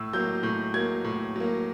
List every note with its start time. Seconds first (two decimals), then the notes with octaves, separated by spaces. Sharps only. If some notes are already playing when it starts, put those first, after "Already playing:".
Already playing: A2 E6
0.13 F#3 A#3 G6
0.43 A2 G6
0.74 F#3 A#3 G#6
1.04 A2
1.36 F#3 A#3